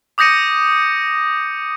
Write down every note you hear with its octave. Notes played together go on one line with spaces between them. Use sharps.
D6 D#6 G6 A#6 C#7 D#7